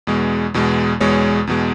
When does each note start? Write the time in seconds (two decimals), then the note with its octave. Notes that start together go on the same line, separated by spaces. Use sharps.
0.07 E2 B2 G#3
0.54 E2 B2 G#3
1.00 E2 B2 G#3 C#5
1.47 E2 B2 G#3